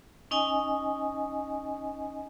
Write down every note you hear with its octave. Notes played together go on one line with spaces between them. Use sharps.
C#4 D#4 D#5 G#5